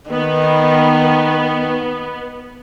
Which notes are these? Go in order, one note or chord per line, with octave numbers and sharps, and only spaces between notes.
D#3 B3